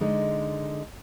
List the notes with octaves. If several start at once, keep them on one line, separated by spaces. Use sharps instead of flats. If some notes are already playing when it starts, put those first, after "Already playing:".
D3 G#3 D#4